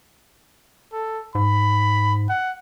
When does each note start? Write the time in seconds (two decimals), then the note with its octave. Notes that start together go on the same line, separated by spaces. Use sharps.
0.92 A4
1.35 G#2 B5
2.29 F#5